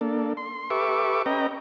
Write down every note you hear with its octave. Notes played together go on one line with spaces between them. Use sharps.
A#3 D4 A4
C6
G4 A4 B4 E5 C#6 D6
C#4 B4 D#5 G5 A#5